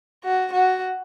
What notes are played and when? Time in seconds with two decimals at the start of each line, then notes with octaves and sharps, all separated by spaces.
0.25 F#4
0.53 F#4